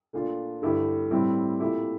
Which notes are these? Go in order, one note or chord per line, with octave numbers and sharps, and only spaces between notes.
A#2 A3 D4 F4
G2 D3 A3 E4 G4
A2 G3 C4 E4 G4
A#2 A3 E4 G4